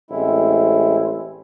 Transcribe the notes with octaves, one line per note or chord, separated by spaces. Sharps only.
A1 G#3 C4 E4